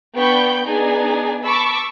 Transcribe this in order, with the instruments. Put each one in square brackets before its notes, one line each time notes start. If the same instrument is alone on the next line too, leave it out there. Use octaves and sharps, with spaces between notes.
[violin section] B3 D4 G5 B5 C#6 G6
B3 D4 D#4 G#4 G#5
A5 B5 C#6 D6 E6